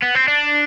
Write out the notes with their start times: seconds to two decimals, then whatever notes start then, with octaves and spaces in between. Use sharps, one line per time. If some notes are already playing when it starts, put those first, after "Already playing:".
0.02 B3
0.15 C4
0.28 D4